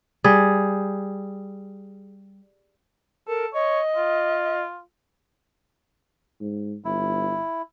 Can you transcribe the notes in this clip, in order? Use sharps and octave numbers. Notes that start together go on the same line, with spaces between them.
G3 G#4
A4 A#4
C#5 D#5
F4
G#2
G1 E4